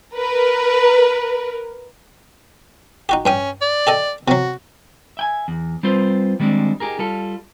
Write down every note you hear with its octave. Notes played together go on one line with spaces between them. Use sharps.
A#4 B4
D#4 F#4 G4
G2 C#4 G5 D#6
D5
G4 A4 D#5
C3 F#3 F#4
E5 G5 G#5
E2
G3 C4 F4 B4 C5
D#3 G3 G#3 C4 D4
D#4 G4 G#4 A#4
G3 F4 A4